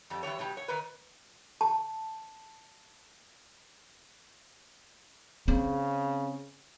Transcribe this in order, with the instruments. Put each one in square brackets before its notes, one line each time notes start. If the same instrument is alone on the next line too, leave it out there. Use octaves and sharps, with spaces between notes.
[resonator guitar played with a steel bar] F2 G3
E3 F#3 G3 C#5
B2 F#3 G3
C#5
D#3 A#4 B4
[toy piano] A5
[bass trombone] C#3 [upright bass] C4